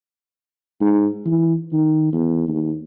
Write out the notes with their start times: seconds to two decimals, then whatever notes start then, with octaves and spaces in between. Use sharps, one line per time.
0.81 G#2
1.26 E3
1.73 D#3
2.13 E2
2.48 D#2